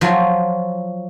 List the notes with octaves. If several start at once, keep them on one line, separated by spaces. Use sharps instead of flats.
F3 F#3 F5